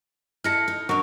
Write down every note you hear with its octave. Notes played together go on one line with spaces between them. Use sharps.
E4 A4 A5 F6 A#6 C#7
D#4
F#3 D4 D#4 A#4 C#5